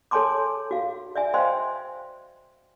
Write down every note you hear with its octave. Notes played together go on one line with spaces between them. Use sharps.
A4 C#5 G#5 A5 C6 D6
F#4 F5
D5 E5 G#5
C5 D#5 F5 G5 G#5 C6